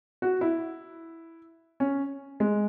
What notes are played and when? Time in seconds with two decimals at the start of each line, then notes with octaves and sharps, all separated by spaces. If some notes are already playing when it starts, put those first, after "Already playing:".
0.22 F#4
0.41 E4
1.80 C#4
2.40 G#3